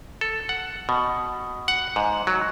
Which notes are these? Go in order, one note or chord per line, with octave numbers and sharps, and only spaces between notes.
A4
F#5
B2
F#5
G#2
F#3